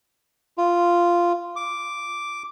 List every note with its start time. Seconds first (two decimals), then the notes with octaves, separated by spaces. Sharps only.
0.58 F4
1.56 D6